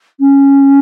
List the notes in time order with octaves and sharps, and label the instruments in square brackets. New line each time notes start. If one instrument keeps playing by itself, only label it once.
[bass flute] C#4